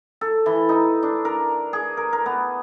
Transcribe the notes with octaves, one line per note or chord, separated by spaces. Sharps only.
A4
E3
D#4
D4
A#4
G#4
A#4
A#4
B3